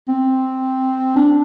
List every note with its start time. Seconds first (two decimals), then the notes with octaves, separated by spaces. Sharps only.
0.08 C4
1.16 D4